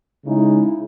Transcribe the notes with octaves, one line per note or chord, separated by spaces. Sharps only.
C#3 G#3 D#4 E4